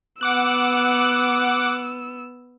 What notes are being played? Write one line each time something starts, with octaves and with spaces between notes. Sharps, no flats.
B3 F#5 D6 E6 F#6